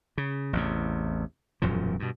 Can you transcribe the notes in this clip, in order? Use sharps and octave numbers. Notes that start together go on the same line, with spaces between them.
C#3
A1 E2 C3
E1 F#2 A#2 F3
G2 B2